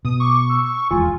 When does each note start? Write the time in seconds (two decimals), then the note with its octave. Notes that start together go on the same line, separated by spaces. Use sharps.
0.05 B2 D#6
0.20 C#6 D6
0.49 E6
0.91 D#1 E2 G#3 F4 G#5